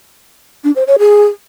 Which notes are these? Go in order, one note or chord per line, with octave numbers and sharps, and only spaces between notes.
D4
C5
C#5
G#4